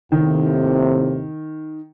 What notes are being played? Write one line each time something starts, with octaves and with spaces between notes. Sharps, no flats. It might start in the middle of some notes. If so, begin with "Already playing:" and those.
D#2 A2 C3 D#3